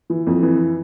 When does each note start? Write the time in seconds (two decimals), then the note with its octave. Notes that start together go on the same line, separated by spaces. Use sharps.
0.10 E3
0.27 F2
0.42 E3